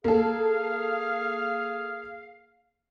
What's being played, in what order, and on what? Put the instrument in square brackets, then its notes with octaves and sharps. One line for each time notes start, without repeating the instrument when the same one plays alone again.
[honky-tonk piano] A#3 A4 [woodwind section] G#4 F5